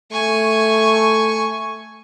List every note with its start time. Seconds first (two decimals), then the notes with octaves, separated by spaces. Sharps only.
0.12 A3 G#5 C#6